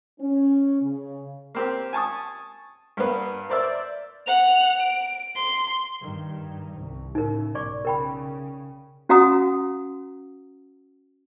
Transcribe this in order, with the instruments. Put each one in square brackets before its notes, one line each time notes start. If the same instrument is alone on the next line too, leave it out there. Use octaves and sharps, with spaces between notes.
[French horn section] C#4
C#3
[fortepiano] A#3 C4 G4
G#5 A5 C#6 D#6
G2 A#3 B3
A#4 C5 D5 E5 E6
[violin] F#5 F7
D7
C6
[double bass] G2 D#3
C2
[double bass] A2 C#3 [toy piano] D#4 A#4
[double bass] B1 G#2 [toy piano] D5 C#6 D6
[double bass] C#3 [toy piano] A#4 G5 B5
[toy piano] C#4 F#4 F5 F#5 A#5 D#6